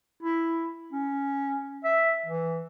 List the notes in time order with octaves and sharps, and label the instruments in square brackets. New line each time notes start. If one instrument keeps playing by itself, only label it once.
[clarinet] E4
C#4
E5
E3